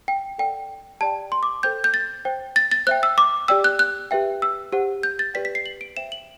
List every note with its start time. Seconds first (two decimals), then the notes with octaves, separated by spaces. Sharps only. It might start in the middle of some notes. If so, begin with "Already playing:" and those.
0.08 G5
0.38 A4 D5 F#5 G5
1.01 G4 D5 G5 A5
1.32 C6
1.43 D6
1.63 A4 C5 G5 G6
1.84 G6
1.94 A6
2.25 C5 G5
2.56 A6
2.72 A6
2.87 C5 E5 G5 F#6
3.03 E6
3.18 D6
3.48 G4 D5 G5 E6
3.64 F#6
3.79 F#6
4.11 G4 B4 E5 G5
4.42 E6
4.73 G4 C5 F#5
5.03 G6
5.19 A6
5.34 G4 B4 D5 G5 B6
5.45 B6
5.55 C7
5.66 F#7
5.81 D7
5.97 C5 E5 G5 E7
6.12 F#7